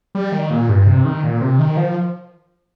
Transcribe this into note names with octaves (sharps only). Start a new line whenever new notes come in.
G3
D#3
A#2
G2
C3
D#3
A#2
C3
D#3
F3